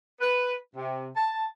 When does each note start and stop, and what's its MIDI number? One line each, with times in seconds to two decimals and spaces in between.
0.21 0.54 71
0.76 1.07 48
1.16 1.46 81